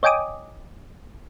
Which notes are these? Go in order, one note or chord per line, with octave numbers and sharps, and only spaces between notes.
C#5 D#5 G5 G#5 D6 D#6